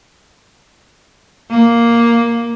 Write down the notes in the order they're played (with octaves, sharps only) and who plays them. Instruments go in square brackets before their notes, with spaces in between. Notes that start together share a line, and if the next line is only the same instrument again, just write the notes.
[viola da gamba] A#3